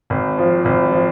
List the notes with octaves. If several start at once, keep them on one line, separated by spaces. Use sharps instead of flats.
G#1
F3
G#1
F3